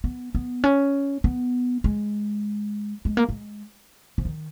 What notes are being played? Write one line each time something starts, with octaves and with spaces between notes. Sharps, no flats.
B3
B3
C#4
B3
G#3
G#3
A#3
G#3
F3
D#3